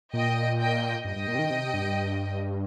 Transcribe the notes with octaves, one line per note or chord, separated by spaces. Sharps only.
A#2 D#5 G5
D#5 G5
G2 D#5 G5
G2
A#2
C3
D#3
C3
G2